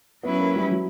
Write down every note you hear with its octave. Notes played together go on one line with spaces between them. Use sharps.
F#3 B3 C#4 E4 B4
A#3
G3
F#3